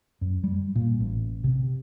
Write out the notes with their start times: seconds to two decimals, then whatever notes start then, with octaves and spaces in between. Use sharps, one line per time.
0.21 F#2
0.44 G3
0.76 A#2
1.00 A1
1.44 C3